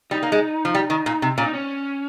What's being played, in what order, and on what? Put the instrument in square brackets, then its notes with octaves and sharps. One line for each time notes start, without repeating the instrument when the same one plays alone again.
[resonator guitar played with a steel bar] G3 [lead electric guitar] D#4
[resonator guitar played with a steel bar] A#3
G#3
F3
G3
D#3
A#2
C3
[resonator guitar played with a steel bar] A#2 [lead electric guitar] C#4
[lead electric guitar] D#4
C#4